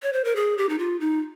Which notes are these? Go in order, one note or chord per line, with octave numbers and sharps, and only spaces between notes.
C#5
C5
A#4
G#4
G4
D#4
F4
D#4